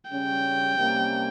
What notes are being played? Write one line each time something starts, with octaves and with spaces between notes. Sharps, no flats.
C#3 G3 C#4 G5
C3 G3 A#3 C#4